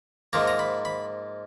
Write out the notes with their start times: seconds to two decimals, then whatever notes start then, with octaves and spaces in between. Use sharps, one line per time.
0.33 G#2 F3 A#3 A#5
0.48 A#5
0.59 B5
0.85 B5